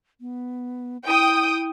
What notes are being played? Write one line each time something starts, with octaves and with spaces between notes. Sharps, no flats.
B3
E4 G5 D#6